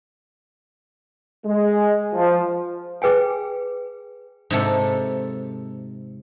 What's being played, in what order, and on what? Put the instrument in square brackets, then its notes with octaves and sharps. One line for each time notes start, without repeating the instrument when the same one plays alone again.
[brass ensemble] G#3
F3
[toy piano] G#4 B4 G5 G#5
[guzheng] G#2 C3 A4